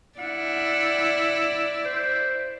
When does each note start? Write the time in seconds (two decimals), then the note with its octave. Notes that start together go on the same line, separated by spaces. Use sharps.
0.19 E4 D5 F#5
1.85 C5